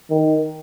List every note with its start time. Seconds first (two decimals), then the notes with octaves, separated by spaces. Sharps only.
0.10 D#3